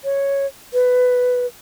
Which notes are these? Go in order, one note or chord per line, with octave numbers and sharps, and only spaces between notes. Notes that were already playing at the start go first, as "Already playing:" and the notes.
C#5
B4